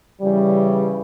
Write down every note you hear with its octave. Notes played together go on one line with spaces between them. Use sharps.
C#3 E3 G3